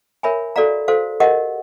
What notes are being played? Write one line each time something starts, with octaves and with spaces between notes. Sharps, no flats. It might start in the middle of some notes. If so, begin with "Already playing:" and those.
A#4 C#5 E5 G#5 B5
F#4 A4 D5 F5 A#5
F#4 A4 C5 F5
G4 A#4 D#5 F#5